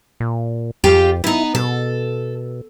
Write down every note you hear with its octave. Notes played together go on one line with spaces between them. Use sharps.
A#2
F2 F4 G4 G5
B3 D#4 E4
B2 A4